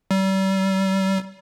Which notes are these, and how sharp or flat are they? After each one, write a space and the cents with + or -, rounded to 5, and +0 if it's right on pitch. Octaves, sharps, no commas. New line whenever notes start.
G3 -35